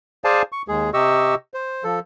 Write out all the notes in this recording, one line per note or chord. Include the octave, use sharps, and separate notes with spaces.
G#4 C5 D5 F5 G#5 A5
C#6
D#2 G#3 G#4
C3 G4 D#5 C#6 E6
C5
F3 A4